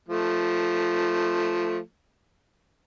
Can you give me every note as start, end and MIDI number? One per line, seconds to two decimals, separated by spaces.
0.08 1.79 53
0.08 1.79 57